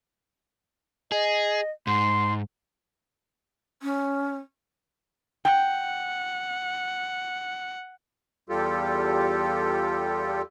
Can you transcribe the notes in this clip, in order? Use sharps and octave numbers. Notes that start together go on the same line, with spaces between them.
G#4 D#5
G#2 C6
C#4
F#5 G5
E2 G3 F4 G4 A4